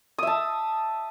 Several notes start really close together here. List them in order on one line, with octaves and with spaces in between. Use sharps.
D#6 E5 A5